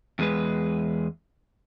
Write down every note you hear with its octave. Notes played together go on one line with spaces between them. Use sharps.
E2 G#3 B4